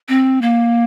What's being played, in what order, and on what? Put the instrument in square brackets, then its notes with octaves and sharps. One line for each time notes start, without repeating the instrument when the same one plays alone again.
[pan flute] C4
A#3